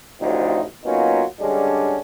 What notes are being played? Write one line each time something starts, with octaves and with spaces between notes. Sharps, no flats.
A1 D2 A2 C3 F3 D#4
F#3 A#3 B3 C#4 D#4 F4
D3 G3 G#3 C#4 D4